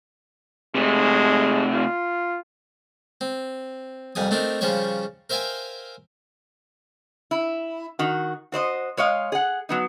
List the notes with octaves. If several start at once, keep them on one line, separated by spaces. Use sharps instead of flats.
C3 G#3 A3
F4
C4
C2 F2 G3 G#5 D#6
A3 C4 D4 D#4 A#4
C#3 F3 G3 C5 C#5 C#6
A#4 C5 E5 F5 G5 G#5
E4
D#3 F#4
F#4 C5 D5 D#5
G#3 C#5 D#5 F5
G#4 F#5
F#3 B3 D#4